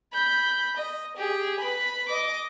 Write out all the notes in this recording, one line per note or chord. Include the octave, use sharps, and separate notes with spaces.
B5 G6
D#5
G4 G#4
B4 B5
D#5 D6